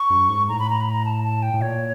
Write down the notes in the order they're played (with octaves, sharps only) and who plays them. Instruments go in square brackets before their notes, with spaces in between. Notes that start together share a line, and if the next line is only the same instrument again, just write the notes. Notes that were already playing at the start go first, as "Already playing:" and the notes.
Already playing: [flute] C#6
[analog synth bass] F#2
G#2
[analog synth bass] A2 [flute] A#5
[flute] B5
A#5
B5
A#5
A5
A5
G5
[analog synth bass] A2
[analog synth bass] A#2 [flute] C#5